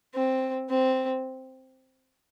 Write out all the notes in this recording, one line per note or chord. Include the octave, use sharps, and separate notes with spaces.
C4
C4